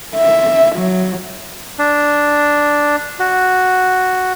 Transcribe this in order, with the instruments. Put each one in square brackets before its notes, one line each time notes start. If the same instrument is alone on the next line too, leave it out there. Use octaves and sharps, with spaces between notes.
[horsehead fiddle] E5
F#3
[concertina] D4
F#4